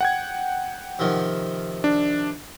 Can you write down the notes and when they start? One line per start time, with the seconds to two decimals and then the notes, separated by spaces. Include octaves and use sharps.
0.01 F#5 G5 G#6
0.99 C3 D#3 F3
1.84 D4